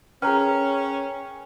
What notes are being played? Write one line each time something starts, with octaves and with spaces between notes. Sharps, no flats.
C#4 G#4 A#4 B4 G5 G#5 A#5 F6